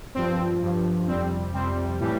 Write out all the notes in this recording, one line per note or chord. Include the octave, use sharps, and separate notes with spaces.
G2 F3 C4
G2 F3
F2 C3 G3 C4
F2 C3 G3 C4
A2 E3 G3